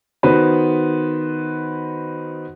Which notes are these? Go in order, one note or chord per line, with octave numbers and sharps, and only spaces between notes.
D#3 B3 F#4 B4 C5